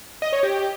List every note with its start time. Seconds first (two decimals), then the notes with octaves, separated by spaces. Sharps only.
0.22 D#5
0.33 C#5
0.43 G4